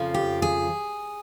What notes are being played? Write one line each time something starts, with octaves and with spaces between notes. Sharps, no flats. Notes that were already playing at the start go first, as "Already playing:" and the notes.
Already playing: F2 C#3 F3
G4
G#4